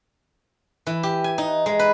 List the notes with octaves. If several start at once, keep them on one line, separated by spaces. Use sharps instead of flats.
E3
G4
G#5
D#4
G#3
B4